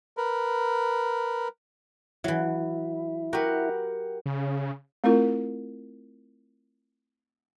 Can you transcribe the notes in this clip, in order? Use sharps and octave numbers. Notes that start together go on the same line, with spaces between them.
A#4 B4
E3 F#3 E4
F#4 G4 A#4 B4 F#5
C#3
A3 C4 E4 F4 A#4